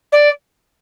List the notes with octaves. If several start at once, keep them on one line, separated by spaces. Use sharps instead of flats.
D5